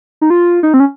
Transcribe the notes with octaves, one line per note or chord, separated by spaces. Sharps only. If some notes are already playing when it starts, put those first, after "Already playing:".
D#4
F4
D#4
C4
C#4